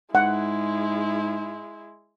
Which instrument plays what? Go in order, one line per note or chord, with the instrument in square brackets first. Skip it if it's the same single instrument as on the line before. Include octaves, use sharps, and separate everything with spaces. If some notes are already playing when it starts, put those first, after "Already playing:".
[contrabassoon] G#2 [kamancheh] G#3 E4 [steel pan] F#5